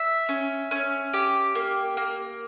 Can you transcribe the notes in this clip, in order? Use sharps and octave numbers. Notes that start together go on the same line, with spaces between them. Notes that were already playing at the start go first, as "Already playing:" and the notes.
Already playing: E5
C#4
C#4
G4
A#3
A#3